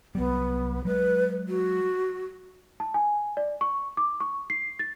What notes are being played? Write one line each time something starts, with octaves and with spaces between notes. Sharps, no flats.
C2 F#3 G3 B3
F#3 G#3 B4
F#4
A5
G#5
D5
C#6
D6
C#6
C7
A6